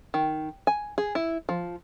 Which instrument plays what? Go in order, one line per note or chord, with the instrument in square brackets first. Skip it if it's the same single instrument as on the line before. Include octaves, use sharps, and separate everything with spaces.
[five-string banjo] D#3
G#5
G#4
E4
F3